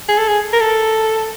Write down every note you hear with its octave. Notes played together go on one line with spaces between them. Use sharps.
G#4
A4
G#4
A#4
A4